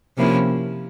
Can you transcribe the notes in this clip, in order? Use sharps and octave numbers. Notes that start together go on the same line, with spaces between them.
C3 F3 A#3 C#4 E4